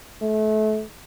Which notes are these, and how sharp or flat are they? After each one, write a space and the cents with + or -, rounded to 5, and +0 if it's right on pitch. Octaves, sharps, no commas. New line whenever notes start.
A3 -30